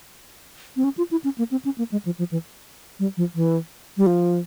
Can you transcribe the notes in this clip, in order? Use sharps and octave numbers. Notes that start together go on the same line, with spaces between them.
C4
C#4
F4
E4
C#4
A#3
C4
C#4
A#3
G#3
F3
F3
E3
G3
F3
E3
G3
F3